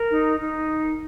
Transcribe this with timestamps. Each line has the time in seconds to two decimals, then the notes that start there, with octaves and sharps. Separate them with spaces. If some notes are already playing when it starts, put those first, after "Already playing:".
Already playing: A#4
0.10 D#4
0.39 D#4